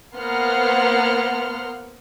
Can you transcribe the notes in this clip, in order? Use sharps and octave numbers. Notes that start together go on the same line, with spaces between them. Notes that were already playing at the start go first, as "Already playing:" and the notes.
A#3 B3 C5 F#5 C6 F6